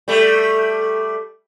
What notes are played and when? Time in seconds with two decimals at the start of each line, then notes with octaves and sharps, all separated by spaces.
0.08 G3 A3